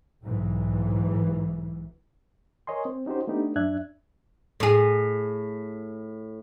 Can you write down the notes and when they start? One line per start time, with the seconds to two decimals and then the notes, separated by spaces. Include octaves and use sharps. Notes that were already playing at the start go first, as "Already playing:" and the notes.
0.24 B1 G#2 E3
2.67 A#4 C#5 D#5 G#5 C6
2.85 C4
3.06 C#4 D#4 F#4 G4 C5
3.27 A3 B3 D4 D#4 G4
3.56 F#2 D4 E5 F#6 G#6
4.60 A2 G#4